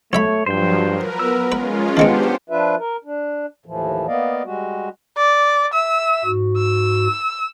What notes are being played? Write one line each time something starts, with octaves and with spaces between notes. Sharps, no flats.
B1 A3 C#5 E5 B5
G2 F3 F#3 C5 G5
A#4 B4
B3 E6
G#3 C#4 F4 B4
D#3 G#3 B3 C4 D4 G4 C5 F#5
F3 D4 F4 B4 E5
A#4
D4
D#2 A2 E3 F3
A#3 B3 D5 D#5 F5
G3 G#3 F#4
D5
E5 E6
G#2 F#4
E6